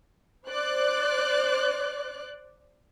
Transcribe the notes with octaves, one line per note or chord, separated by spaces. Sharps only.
C5 D5 F#6